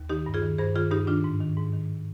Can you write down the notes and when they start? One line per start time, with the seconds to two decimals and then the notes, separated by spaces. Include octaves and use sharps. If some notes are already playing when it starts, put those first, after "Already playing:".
Already playing: D#2
0.09 D#3 D#4 G4
0.26 G2
0.34 F4 G#4
0.42 D#3
0.58 G2 G#4 C5
0.75 D#3 F4 G#4
0.91 G2 D#4 G4
1.07 D#3 D4 F4
1.24 G#2
1.41 D#3
1.57 G#2
1.73 D#3